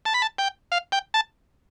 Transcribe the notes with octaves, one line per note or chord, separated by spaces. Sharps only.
A5
B5
A5
G5
F5
G5
A5